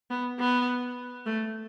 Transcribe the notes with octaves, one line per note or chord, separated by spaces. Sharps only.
B3
B3
A3